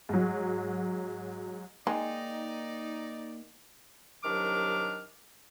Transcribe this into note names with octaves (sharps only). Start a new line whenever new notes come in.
G#2 F#3
G#3 A#3 D#4 D5 G5
C2 D#3 F#3 D4 D6 F6